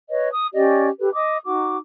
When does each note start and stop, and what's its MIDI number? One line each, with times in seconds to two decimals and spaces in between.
0.09 0.29 71
0.09 0.29 73
0.09 0.29 75
0.33 0.48 87
0.53 0.88 61
0.53 0.88 67
0.53 0.88 74
0.53 0.88 75
1.00 1.12 67
1.00 1.12 69
1.00 1.12 71
1.13 1.37 75
1.13 1.37 86
1.13 1.37 87
1.45 1.77 63
1.45 1.77 66
1.45 1.77 86